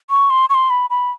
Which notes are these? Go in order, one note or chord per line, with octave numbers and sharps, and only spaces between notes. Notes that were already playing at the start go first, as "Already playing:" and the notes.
C#6
C6
C#6
C6
B5
B5